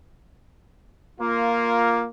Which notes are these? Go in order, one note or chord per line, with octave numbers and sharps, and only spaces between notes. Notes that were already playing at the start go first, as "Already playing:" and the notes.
A#3 F4